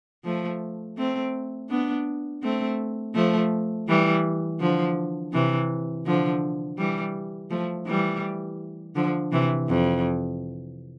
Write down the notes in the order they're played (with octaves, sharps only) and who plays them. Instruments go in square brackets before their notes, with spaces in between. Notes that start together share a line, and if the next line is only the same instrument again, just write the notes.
[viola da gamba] F3 A3
A3 C4
B3 D4
A3 C4
F3 A3
E3 G3
D3 F3
C3 E3
D3 F3
E3 G3
F3 A3
E3 G3
D3 F3
C3 E3
F2